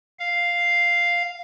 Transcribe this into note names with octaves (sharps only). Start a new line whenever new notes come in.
F5